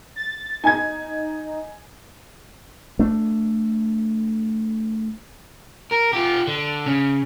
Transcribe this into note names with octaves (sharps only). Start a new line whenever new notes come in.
A6
D#4 G#5 G#6
A3 D4
A#4
F4 G4
D3
C#3